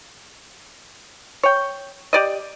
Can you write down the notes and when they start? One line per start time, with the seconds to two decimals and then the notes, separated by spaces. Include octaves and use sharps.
1.43 C#5 G5
2.13 G4 D5 D#5